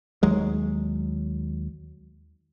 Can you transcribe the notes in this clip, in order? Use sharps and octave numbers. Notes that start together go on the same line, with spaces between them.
D#2 F#3 G#3